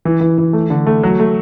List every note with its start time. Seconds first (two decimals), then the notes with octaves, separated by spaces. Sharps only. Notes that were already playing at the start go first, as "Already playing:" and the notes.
0.05 E3
0.21 E3
0.38 E3
0.53 A3
0.70 D3
0.87 A3
1.03 F#3
1.20 A3